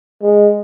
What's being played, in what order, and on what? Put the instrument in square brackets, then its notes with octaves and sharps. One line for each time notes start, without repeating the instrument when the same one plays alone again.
[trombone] G#3